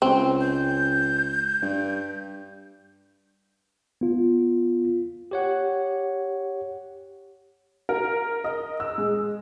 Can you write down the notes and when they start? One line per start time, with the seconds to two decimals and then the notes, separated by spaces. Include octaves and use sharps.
0.02 C#2 C4
0.41 G6
1.62 G2
4.01 B3 F4
5.31 G4 C#5 F#5
7.89 A#4
8.44 D#5
8.80 E6
8.98 G#3